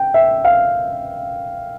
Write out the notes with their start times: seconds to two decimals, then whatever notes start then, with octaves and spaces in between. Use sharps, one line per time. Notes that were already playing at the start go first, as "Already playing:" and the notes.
Already playing: G5
0.14 E5
0.45 F5